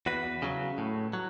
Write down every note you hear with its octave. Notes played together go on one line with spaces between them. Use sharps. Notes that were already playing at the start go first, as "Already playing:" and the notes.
E2 F#4 B4
C#3 F#3
A2
F#3